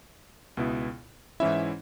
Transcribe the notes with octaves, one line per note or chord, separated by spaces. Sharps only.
C#2 B2 B3 E4
G#2 E3 C#4 E4 E5